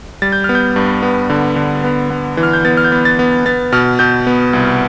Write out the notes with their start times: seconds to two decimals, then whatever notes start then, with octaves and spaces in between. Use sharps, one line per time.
0.22 G3 A6
0.32 G6
0.44 B3 F6
0.55 G6
0.76 G2
1.02 B3
1.30 D3
1.56 D3
1.84 B3
2.10 B3
2.37 E3
2.43 F6
2.53 G6
2.65 B3 A6
2.77 F6
2.85 G6
2.92 B3
3.05 A6
3.19 B3
3.46 B3 A6
3.72 B2 F6
3.99 B2 G6
4.27 B3
4.53 C2